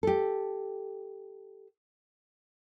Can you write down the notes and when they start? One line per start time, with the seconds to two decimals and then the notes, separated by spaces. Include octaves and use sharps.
0.03 G4 A4